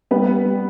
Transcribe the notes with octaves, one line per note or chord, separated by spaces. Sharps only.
G3 B3 B4
G3